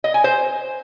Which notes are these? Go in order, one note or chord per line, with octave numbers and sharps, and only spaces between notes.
D#5
G#5
C5